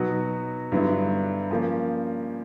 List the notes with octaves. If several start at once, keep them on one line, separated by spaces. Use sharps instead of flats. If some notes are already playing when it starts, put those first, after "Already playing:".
Already playing: B2 F#3 B3 D#4 F#4
G2 D3 F#3 B3 E4
F3 A#3 C#4